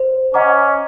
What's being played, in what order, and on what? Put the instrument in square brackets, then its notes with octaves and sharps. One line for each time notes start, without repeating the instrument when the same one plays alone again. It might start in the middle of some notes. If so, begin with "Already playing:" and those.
Already playing: [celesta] C5
[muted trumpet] C#4 [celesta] D#5 F#5 A#5 D6